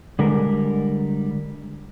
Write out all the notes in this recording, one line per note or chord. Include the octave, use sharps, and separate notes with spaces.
D3 G3 G#3 A#4